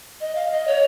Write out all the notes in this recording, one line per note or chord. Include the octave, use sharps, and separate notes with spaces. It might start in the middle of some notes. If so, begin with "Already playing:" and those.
D#5
F5
D#5
C#5